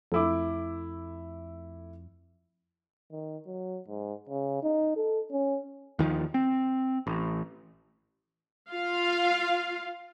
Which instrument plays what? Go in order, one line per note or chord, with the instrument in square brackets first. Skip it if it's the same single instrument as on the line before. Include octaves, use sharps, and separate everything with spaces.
[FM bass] F2 [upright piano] A3 E4 D6
[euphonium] D#3
F#3
G#2
C#3
D#4
A4
C#4
[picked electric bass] D#2 D#3 F3
C4
A1
[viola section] F4 F5